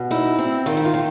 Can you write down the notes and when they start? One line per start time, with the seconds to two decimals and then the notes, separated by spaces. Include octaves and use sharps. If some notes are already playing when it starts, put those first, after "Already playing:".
Already playing: B2
0.11 D#4 E4
0.38 C4
0.66 D#3 F4
0.77 E4
0.85 F4
0.94 D#3